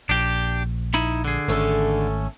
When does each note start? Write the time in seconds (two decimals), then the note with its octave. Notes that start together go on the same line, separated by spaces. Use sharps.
0.09 A#1 D4 G4
0.94 D#4 E4 B5
1.25 D3 G#4
1.48 G#1 A3 C#4 A4